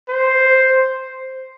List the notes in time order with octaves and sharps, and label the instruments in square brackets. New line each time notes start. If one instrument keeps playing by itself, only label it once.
[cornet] C5